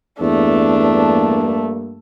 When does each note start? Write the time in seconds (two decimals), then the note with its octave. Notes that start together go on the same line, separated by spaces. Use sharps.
0.21 E2 G2 A3 A#3 D4